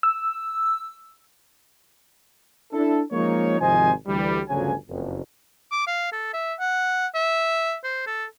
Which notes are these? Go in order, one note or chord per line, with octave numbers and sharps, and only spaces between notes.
E6
D4 E4 A4
F3 G#3 A#3 C#4 D#4 C#5
G#1 C3 F3 C5 D#5 G#5
D2 E3 G3
G1 D2 C#3 F3 F#3 G#5
F#1 F2
D6
F5
A4
E5
F#5
E5
C5
A4